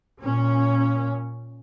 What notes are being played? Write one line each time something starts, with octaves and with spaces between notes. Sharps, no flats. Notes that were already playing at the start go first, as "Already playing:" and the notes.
A#2 C#4